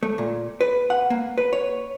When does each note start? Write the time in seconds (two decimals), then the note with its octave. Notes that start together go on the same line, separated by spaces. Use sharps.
0.03 A3
0.18 A#2
0.61 B4
0.90 F#5
1.10 A#3
1.38 B4
1.53 C#5